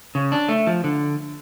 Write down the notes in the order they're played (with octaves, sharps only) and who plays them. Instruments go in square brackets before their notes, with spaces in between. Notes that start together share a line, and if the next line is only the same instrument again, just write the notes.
[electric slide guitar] C#3
D4
A3
F3
D3